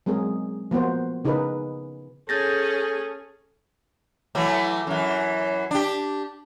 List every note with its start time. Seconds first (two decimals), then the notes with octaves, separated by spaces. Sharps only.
0.06 F#3 G#3 C4 G#4 A#4
0.71 F3 A#3 B3 F#4 C5
1.25 C#3 D#4 G#4 A#4 B4
2.29 C#4 G#4 A4 G6 A6 A#6
4.35 E3 F#3 A3
4.87 F#2 E3
5.71 D4 G4